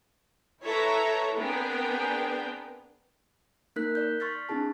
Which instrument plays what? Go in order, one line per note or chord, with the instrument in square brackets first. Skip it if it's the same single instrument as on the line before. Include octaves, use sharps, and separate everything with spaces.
[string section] E4 A4 B4 C#5 E5 A#5
B3 C4 D4 G#4 A#4 G5
[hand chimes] A#3 D#4 A#4 F#6 B6
D5 G6
C6 C#6 F6 A6 B6
C4 D4 E4 G#4 A5